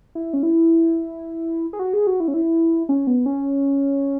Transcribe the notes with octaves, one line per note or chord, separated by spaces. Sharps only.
E4
C#4
E4
G#4
F#4
G#4
F#4
E4
C#4
E4
C#4
B3
C#4